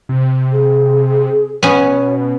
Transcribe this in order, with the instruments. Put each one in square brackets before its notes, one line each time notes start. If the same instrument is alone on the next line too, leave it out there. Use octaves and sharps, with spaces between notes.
[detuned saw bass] C3
[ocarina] G#4
[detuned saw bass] B2 [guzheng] B3 C#4 [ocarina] C#5